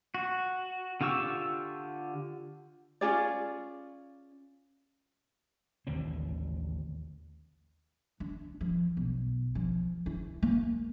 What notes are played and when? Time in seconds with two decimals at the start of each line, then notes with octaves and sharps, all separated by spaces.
0.15 F#4
1.01 D3 F4 G4 C#6 E6
3.01 C#4 F4 G#4 D5
5.87 A1 D#2 D3 C4
8.20 D4
8.61 F3
8.97 B1
9.55 F3
10.06 E4
10.43 A#3